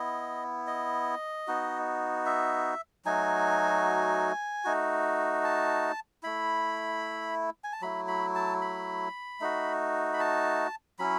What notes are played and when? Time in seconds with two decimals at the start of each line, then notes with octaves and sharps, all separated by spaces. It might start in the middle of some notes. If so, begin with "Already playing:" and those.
Already playing: B3 E4 D#5
0.67 D#5
1.47 B3 D#4 F#4
2.26 E5
3.05 F#3 A3 D#4 F#4 G#5
4.64 A3 D#4 F#4
5.44 A5
6.23 A3 E4 B5
7.64 G#5
7.73 A5
7.81 F#3 A3 E4 B5
8.08 B5
8.35 A5
8.62 B5
9.40 A3 D#4 F#4
10.13 B5
10.20 A5
10.99 F#3 C#4 E4 B5